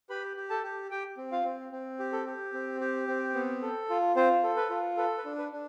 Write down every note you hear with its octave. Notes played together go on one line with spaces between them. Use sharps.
G4 B4 B5
G4
A4 A5
G4
G4 G5
C4
F4 F5
C4
C4
G4
A4
G4
C4
G4
C4
B3
A4
F4
C4 F4 C5
A4
B4
F4
A4 B4
B4
D4
B4
D4